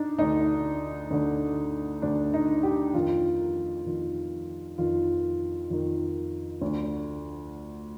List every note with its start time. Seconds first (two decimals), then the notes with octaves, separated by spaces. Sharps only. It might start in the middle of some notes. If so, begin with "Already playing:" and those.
Already playing: D4 D#4
0.19 D2 D3 D#4
1.11 D2 D3
2.02 D2 D3 D4
2.34 D#4
2.63 G4
2.94 F2 D#3 F4
3.86 F2 D#3
4.78 F2 D#3 F4
5.71 F2 D#3
6.62 D2 D3